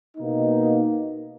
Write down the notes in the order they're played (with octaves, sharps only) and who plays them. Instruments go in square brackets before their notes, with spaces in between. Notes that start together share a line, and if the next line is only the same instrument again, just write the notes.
[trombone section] B2 A#3 D#4